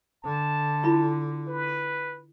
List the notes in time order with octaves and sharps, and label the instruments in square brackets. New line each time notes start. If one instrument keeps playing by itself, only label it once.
[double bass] D3 [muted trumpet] A5
[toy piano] E4 F4 B5
[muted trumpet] B4